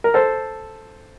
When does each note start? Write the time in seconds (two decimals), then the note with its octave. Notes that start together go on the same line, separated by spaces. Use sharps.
0.04 A#4
0.14 A4 C5